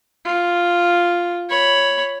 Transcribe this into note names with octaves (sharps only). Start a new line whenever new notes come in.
F4
C#5 B5